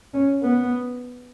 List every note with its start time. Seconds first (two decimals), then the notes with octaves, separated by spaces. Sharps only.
0.13 C#4
0.42 B3